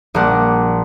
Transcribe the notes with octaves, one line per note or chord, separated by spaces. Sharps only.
A#1 A#2 G3 A#3 F#5